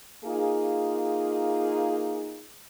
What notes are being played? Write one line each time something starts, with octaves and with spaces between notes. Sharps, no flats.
A#3 D#4 F4 G#4